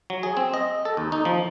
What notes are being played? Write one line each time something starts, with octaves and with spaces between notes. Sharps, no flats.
F#3
G#4
C4
D#5
A4
D#2
D#4
F3